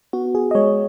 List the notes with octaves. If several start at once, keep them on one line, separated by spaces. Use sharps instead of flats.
B3 F#4
G#4
D#5
G#3 C#5